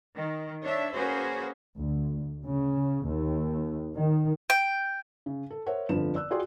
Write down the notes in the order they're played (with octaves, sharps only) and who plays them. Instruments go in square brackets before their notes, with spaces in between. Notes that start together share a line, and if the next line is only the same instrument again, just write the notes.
[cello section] D#3
D4 C#5 E5
A#3 C#4 F#4 G#4 B4 C5
[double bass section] D2
C#3
D#2
D#3
[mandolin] G5
[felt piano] C#3
A4
A#4 C5 C#5 E5 F#5
G1 F2 D3 F3 B4 E7
D5 E6 F#6
F4 F#4 G#4 D5 G5 C6